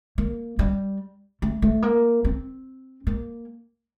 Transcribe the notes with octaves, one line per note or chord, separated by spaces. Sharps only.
A#3
G3
A3
A3
A#3
C4
A#3